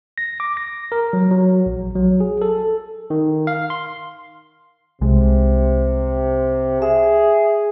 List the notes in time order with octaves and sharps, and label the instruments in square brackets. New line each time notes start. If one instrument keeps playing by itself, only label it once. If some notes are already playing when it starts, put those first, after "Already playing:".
[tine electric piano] A#6
D6
A#6
A#4
F#3
F#3
A#1
F#3
G#4
A4
D#3
F5
C6
[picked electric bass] C2 G#3 [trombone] C3
[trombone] G#4 [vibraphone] E5